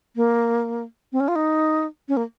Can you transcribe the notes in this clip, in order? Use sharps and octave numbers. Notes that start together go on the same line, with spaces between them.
A#3
C4
C#4
F4
D#4
C#4
A#3